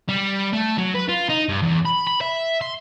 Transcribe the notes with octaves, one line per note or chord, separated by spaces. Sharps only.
G3
A3
F#3
B4
F4
D#4
G2
E2
B5
B5
E5
C6